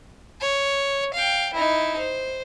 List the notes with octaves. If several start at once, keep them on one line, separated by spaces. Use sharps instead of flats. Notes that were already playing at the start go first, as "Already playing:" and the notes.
C#5
F5 G5
D#4 E4
C5